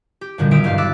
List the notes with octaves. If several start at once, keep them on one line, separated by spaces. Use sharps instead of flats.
G4
F#2 A#2 D3 D#3 G3
B1 D#3 F4 E5 D#6 D7
E1 G2 G4 A4 F5
D6 E6 F#6 A6 B6 E7